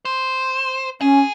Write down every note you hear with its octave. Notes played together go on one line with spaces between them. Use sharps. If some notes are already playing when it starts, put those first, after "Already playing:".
C5
C#4 G#4